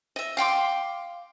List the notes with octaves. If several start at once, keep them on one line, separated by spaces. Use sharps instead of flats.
D#5 E5
F5 G5 C6 D6